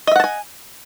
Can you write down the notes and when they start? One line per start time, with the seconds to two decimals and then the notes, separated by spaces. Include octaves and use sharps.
0.07 D#5
0.12 E5
0.16 F#5
0.20 A5
0.24 G#5